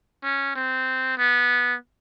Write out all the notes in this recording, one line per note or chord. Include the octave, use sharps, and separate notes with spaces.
C#4
C4
B3